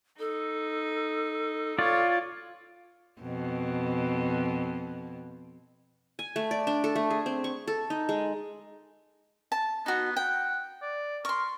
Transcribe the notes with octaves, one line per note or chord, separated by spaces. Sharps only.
D#4 A4
F4 C#5 D5
F2 B2
G#5
A3
D5
D4
A4
A3
G#4
C4
C#6
A4
D#4
G#3
A5
B3 D#4 F#4
F#5 G5
D5
A#4 C6 C#6